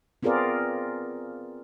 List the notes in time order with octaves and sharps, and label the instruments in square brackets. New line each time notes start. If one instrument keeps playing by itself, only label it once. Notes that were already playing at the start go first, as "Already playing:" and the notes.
[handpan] B3 C4 F4 G#4 A#4 D5